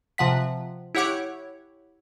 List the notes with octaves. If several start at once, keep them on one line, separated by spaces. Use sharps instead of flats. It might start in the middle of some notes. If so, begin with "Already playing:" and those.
C3 F3 F#5 B6
E4 G4 C#5 F#5 D6 G#6